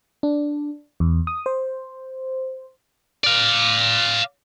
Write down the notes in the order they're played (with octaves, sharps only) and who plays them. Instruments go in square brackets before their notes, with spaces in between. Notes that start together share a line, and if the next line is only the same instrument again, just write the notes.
[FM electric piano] D4
E2
D#6
C5
[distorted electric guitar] D5 F5